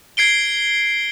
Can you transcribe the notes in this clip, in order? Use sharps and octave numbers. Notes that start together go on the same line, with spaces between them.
G#6 C7 D7 G7